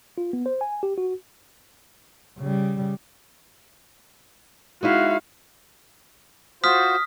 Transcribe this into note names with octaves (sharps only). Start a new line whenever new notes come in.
F4
B3
C5
G#5
G4
F#4
C#3 G3
G#3 D#4 E4 F#4 F5
F4 F#4 C5 D#6 F6 B6